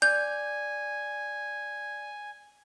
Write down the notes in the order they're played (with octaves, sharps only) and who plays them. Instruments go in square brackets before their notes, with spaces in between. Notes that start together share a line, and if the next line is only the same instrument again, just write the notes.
[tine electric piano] D5 [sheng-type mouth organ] G#5 [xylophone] G6